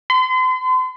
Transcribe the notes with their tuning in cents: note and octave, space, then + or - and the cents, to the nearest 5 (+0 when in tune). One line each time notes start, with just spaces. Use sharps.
C6 -40